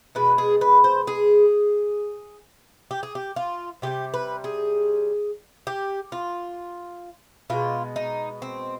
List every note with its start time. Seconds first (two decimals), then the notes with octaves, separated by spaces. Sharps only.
0.15 B2 G#3 B4
0.38 G#4
0.61 B4
0.84 C5
1.07 G#4
2.91 G4
3.03 G#4
3.15 G4
3.36 F4
3.82 C3 D#3 G3 G4
4.14 B4
4.44 G#4
5.67 G4
6.12 F4
7.50 B2 G#3 F4
7.96 D#4
8.42 C4